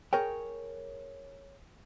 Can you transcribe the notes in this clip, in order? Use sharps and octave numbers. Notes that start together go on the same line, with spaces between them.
G#4 A#4 C#5 G5